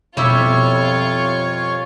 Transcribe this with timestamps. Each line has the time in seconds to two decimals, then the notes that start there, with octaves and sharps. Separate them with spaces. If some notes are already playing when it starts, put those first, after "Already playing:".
0.17 F2 B2 G3 E4 F4 C#5 C#6